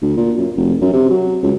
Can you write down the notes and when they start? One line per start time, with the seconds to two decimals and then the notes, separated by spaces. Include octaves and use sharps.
0.02 D2
0.17 A#2
0.38 F#2
0.56 F1
0.81 F#2
0.93 C3
1.10 F#3
1.42 C#2